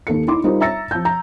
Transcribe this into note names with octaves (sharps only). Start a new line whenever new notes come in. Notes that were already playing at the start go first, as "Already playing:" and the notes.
D#2 A#3 A4 C#7
D#4 E4 C6 D6
G3 D#4 F4 A#4 C5
E5 A#5 E6 A6 A#6 C#7
F3 A5 G6
A#5